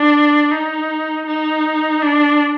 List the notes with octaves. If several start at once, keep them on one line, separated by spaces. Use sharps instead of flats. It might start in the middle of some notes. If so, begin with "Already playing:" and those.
Already playing: D4
D#4
D#4
D4